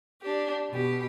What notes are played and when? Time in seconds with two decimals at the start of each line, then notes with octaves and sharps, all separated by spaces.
0.22 D4 G4
0.69 B2 G4